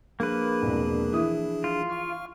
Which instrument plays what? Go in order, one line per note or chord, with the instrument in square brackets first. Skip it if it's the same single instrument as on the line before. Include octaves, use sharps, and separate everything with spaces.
[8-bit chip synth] F3 D4 G#4 [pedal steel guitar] A#3 B4
[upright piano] E1 C2
E3 E4 D#6
[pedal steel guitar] F4
[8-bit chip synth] F5 C#6 F6